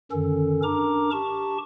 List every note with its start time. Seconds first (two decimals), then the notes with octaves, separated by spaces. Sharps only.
0.11 F#2 D3 D#3 C#4 A4
0.63 D4 A#4 A#5 D6
1.12 G4 A5 C#6